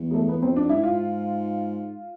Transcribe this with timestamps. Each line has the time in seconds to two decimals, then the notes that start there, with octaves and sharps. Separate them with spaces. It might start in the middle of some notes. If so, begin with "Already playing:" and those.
Already playing: E2
0.11 G#3
0.14 A3
0.29 B3
0.42 F2 C4
0.56 D4
0.69 G#2 E4
0.83 F4